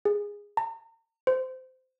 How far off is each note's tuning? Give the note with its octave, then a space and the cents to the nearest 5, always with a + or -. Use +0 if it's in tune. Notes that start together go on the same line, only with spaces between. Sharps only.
G#4 -15
A#5 -40
C5 -20